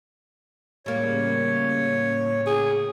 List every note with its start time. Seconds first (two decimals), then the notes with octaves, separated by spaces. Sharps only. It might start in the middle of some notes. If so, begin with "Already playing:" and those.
0.86 A2 C#3 G3 A#3 C#5
2.46 G#4